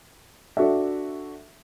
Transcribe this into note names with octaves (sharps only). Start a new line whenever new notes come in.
D4 F#4 A4 E5